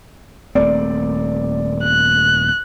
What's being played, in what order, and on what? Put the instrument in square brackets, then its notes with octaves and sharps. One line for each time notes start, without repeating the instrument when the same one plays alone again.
[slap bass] D#1 A3 C4 [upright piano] D5
[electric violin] F#6